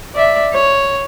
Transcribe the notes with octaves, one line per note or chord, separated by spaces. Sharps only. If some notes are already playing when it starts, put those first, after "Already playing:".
D5 E5
C#5